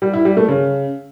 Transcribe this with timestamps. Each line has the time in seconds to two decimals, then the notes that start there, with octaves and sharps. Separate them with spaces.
0.02 G3
0.13 E4
0.25 G3
0.37 A3
0.48 C#3